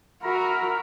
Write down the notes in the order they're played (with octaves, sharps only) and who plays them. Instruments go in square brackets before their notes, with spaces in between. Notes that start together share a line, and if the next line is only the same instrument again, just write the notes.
[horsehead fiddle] F#4 A#4 [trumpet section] E5 A#5 B5